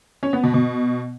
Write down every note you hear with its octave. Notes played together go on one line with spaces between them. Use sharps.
C#4
B3
B2
B2